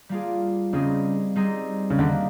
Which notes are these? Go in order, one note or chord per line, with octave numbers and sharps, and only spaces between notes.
G3 A#3 D4 F4 G#4
C#3 G3 C4 D#4 G#4
G3 C4 D#4 G#4
C#3
D3 D#3 G3 A#3